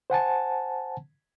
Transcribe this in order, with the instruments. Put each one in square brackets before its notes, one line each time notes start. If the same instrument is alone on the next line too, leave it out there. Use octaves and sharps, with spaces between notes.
[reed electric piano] C5 F#5 G#5 A5